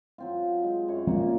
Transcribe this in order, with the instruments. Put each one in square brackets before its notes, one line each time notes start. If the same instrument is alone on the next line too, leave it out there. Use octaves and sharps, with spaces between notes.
[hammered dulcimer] F#3 C4 F4
G#3
F#2 C#5
[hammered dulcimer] A#2 A#3 [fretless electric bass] F3 G#3 C4